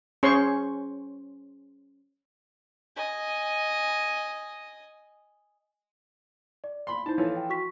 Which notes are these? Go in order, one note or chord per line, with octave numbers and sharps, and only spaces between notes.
C#4 G#4 C5 C#5 C6 C#6
D#5 G#5
D5
B5 C6
D#4 E4 C5 A5
E3 F3 A4 C#5
G5
F#4 C#6 B6